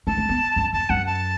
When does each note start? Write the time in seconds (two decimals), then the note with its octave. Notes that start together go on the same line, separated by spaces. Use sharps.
0.07 A3 A5
0.17 A3
0.29 B3
0.56 F#2
0.73 E2 A5
0.90 F#2 F#5
1.06 A5